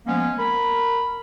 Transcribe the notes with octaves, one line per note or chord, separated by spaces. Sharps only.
F3 G#3 A#3 B3 C#4
A#4 B5